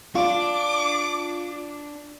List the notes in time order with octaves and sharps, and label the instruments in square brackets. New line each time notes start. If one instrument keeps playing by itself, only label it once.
[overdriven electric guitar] D4 D5 [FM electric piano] F4 [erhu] D6